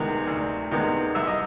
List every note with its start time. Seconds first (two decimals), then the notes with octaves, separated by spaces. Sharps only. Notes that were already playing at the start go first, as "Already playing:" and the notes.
Already playing: D2 C3 D#3 G#3 B3
0.27 D2
0.71 C3 D#3 G#3 B3
1.15 C2 E5
1.27 D#5